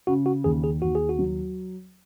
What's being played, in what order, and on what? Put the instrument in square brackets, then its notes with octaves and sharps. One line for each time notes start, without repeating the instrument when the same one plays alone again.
[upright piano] C#3 [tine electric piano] F#4
[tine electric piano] F#4
[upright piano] D#2 [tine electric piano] G#4
[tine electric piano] G#4
[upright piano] D#2 [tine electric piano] F#4
[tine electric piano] G#4
F#4
[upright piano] F#3